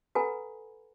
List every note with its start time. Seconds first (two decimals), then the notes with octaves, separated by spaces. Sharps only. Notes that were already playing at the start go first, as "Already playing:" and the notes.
0.15 A4 B4 F#5 G#5 A#5 B5